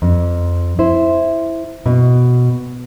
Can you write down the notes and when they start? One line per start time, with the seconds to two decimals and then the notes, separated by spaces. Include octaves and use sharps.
0.02 F2
0.79 E4 C5
1.86 B2